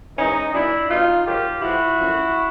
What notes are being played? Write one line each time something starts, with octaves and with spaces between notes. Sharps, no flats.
G#2 E3 C#4 D#4
A#2 F#3 D4 E4
B2 F#3 D#4 F4
G#2 D#3 F#3 F4 G4
A2 F3 E4 F#4
F#2 D3 F3